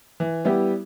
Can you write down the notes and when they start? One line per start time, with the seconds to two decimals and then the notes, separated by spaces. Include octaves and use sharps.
0.20 E3
0.45 G3 B3 E4 G4